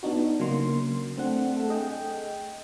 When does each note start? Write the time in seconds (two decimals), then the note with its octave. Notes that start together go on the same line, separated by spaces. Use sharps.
0.03 B3 D4 D#4 F#4
0.40 C#3 F#3 A#3 C6
1.17 A3 C4 D4 F#5
1.53 A3 A4
1.69 G#4 D#5 G5